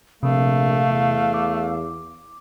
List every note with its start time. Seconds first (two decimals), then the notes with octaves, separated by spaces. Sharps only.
0.23 A#1 C3 A3 F5
0.90 E2
1.34 D6